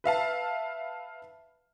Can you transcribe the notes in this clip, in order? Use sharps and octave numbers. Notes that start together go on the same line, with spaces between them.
B4 E5 F5 A5